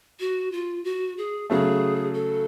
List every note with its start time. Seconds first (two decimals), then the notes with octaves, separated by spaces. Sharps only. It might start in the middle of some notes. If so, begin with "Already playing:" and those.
0.20 F#4
0.52 F4
0.84 F#4
1.18 G#4
1.50 C#3 F#3 A3 G#4
2.14 A4